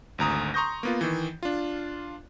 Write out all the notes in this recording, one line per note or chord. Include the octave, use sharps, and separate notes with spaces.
G#1 D2 A#5 D#6
A#5 C6 C#6 D#6 G6 A#6
A#3 B3 F4
D#3 E3
D4 F4